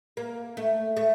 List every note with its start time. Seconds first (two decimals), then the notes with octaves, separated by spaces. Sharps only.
0.17 A#3
0.57 A3
0.97 A3